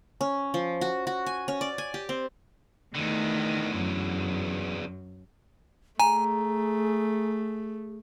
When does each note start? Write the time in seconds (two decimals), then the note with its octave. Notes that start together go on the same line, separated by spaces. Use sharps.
0.21 C#4
0.54 F3
0.81 F#4
1.07 F#4
1.26 G#5
1.48 C#4
1.61 D5
1.78 G#5
1.94 G4
2.09 C4
2.95 E2 D3 D#3 A3
3.76 F#2
6.00 A3 G#4 G#5 A#5